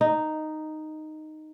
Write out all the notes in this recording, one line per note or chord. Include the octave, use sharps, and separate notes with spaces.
D#4